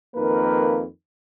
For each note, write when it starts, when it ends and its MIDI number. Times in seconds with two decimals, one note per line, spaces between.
0.16 0.84 41
0.16 0.84 51
0.16 0.84 58
0.16 0.84 71